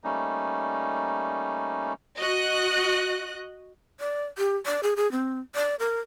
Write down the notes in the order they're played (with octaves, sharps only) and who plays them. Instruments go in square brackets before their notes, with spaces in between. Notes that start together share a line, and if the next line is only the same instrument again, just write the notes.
[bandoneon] G3 A3 A#3 C#4 D#4
[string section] F#4 D#5 F#6
[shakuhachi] D5
G4
D5
G#4
G#4
C4
D5
A#4